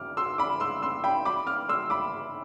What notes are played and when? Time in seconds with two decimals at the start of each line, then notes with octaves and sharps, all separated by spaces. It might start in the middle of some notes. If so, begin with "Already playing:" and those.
Already playing: D6 F6
0.17 C6 E6
0.38 B5 D6
0.60 C6 E6
0.82 C6 E6
1.04 G5 B5
1.25 B5 D6
1.47 D6 F6
1.69 C6 E6
1.90 B5 D6